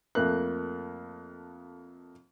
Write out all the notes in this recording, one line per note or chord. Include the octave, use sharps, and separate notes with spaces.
F2 A3 A#3 F#6